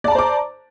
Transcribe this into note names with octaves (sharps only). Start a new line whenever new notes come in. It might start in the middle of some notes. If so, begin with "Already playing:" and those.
C5 D5 A5 A#5 D6